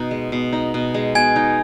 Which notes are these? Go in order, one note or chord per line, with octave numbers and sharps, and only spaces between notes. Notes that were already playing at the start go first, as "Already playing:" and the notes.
Already playing: B2 D#4
G#3
B2
D#4
B2
G#3
B2 G#5 G#6
D#4